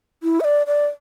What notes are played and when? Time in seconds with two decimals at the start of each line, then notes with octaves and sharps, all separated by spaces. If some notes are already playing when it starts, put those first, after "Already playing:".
0.23 E4
0.40 E5
0.44 D5
0.67 D5